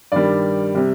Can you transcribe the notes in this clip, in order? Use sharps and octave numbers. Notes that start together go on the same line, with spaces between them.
G2 D#3 G3 D5
C3 G3